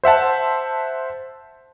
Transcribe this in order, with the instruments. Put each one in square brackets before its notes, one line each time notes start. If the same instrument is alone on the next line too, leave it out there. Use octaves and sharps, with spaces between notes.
[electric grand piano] C5 E5 F#5 A5